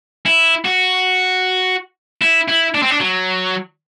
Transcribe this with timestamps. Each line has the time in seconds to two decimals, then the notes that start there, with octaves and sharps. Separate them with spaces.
0.26 E4
0.65 F#4
2.21 E4
2.48 E4
2.75 D4
2.83 C4
2.91 D4
3.00 F#3